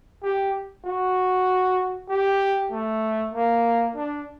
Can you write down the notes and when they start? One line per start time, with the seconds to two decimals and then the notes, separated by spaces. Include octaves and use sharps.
0.23 G4
0.85 F#4
2.09 G4
2.72 A3
3.34 A#3
3.95 D4